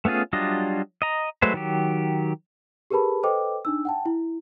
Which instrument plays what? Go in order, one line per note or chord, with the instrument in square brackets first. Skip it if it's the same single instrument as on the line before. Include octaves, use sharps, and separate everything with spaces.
[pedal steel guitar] A3 B3 C#4 F4 G#4
F#3 G3 D4 F4 D#5
D#5 A#5
F#3 G#3 A3 B4 C5
D#3 F#3 G4
[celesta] G4 G#4 A#4 B4 A5 B5
A4 B4 C5 D#5 G5 D6
D4 D#4 E6
F#5 G5 A5
E4